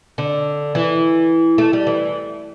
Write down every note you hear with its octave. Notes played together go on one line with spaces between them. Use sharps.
D3
E3
A3
G3
E3